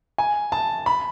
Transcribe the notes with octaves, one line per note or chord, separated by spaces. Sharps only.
G#5
A5
B5